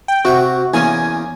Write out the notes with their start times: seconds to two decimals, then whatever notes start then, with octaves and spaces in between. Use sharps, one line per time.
0.08 G5
0.25 C3 F#4 G5 C#6
0.74 E2 A#3 C#4 G#5